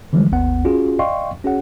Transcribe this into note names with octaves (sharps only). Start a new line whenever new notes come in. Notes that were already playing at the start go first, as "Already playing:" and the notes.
D3 E3 F3 G3 G#3
G#1 D#2 B3 F#5
C#4 F4 F#4 G#4
D5 D#5 F5 G5 C6 C#6
C#4 F#4 G#4 C#5 F#5